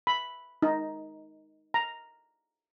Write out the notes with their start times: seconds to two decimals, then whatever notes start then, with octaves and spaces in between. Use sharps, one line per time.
0.07 B5
0.62 D#4
1.74 A#5